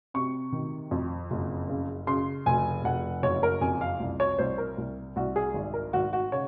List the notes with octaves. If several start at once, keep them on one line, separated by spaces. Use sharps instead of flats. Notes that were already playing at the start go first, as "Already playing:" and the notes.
C3 C#6
D#3
F2
F#1
C#3
C#3 C6
F1 G#5
F1 F#5
F#1 C#5
A#4
F2 G#5
F5
C2
C#5
C2 C5
A#4
C2
C2 F#4
G#4
G#1
A#4
G#1 F#4
F#4
C#3 C#5